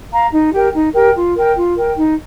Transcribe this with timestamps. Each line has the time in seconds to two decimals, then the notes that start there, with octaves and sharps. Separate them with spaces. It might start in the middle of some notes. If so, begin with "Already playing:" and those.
0.11 F5 A#5
0.32 D#4
0.53 G4 A#4 G5
0.73 D#4
0.94 G4 A#4 G5
1.16 F4
1.35 A#4 G5
1.56 F4
1.76 A#4 G5
1.97 D#4